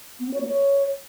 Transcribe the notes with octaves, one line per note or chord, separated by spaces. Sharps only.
B3
C4
C#5
A#3
C#5